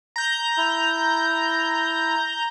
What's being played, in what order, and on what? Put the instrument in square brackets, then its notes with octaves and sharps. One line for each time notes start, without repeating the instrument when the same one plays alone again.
[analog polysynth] A#5 G6
[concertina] E4